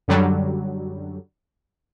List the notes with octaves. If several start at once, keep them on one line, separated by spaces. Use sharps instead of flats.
F#2 D3 F#3 G3